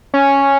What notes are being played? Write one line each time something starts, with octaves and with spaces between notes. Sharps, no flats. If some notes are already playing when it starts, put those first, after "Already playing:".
C#4